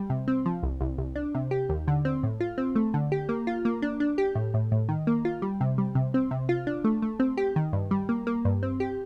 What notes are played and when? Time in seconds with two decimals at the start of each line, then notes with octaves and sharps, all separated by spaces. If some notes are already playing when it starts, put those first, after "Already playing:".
Already playing: G3
0.10 C3
0.28 C4
0.46 F3
0.63 C2
0.81 C2
0.98 C2
1.16 D4
1.35 C3
1.51 G4
1.69 D#2
1.88 D3
2.05 C4
2.23 A2
2.40 F4
2.58 C4
2.76 A3
2.94 D3
3.12 G4
3.29 A#3
3.47 F4
3.65 A#3
3.82 D4
4.00 D4
4.18 G4
4.35 A2
4.54 A2
4.72 A2
4.89 D#3
5.07 A#3
5.25 F4
5.42 G3
5.61 C3
5.78 G3
5.95 C3
6.14 C4
6.31 C3
6.49 F4
6.67 D4
6.84 A3
7.02 A3
7.20 C4
7.37 G4
7.56 D#3
7.73 G2
7.91 G3
8.09 A#3
8.27 A#3
8.45 G2
8.63 C4
8.80 G4